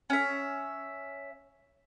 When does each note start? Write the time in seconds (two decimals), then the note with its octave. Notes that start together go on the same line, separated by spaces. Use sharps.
0.10 C#4 E5